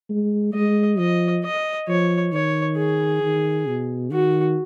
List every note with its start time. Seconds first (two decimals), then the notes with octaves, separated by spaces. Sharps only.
0.09 G#3
0.54 G#3 D#5
0.99 F3 D#5
1.44 D#5
1.88 F3 C#5
2.32 D#3 C#5
2.77 G#4
3.22 D#3
3.67 B2
4.11 D#3 F#4